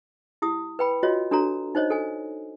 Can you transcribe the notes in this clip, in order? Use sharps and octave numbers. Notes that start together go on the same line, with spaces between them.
E4 G4 D#6
B4 G5 B5
F4 F#4 C#5 D#5
D4 F#4 A4 C#5 A#5
D#4 C5 C#5 D#5
A4 G#5